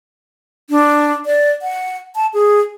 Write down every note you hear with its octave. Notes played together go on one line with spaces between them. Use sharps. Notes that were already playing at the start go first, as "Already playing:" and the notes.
D4
D5
F#5
A5
G#4